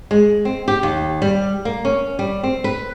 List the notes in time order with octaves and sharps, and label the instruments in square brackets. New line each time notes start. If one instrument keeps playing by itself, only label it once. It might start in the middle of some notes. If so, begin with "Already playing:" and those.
[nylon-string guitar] G#3
C4
G4
D#2
G3
A#3
C#4
G3
C4
B4